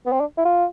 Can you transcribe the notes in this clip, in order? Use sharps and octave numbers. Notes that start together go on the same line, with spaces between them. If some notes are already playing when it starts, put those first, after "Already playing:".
B3
C4
D4
E4
F4